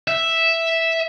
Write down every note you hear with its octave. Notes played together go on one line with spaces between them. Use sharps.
E5